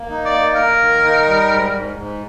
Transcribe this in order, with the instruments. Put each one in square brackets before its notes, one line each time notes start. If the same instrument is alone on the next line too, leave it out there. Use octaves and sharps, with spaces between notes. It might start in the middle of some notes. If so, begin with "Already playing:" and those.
Already playing: [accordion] A#3
D#4
[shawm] D5
[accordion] A#3
[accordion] A#3 [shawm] A#4
[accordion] D#3
D#4
G3
G#2
G#2
G#2